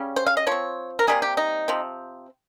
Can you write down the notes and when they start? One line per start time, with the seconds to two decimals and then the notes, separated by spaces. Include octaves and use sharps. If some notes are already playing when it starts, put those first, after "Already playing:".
Already playing: C#3 G3 C#4
0.16 C5
0.26 F5
0.37 D#5
0.47 F3 C4 C#5
0.99 A#4
1.07 C3 D#3 G3 A#3 G#4
1.22 G4
1.37 D#4
1.68 C3 F3 C4